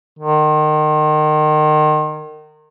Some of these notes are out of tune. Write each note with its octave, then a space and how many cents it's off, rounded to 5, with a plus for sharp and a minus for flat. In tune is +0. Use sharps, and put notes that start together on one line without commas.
D#3 -30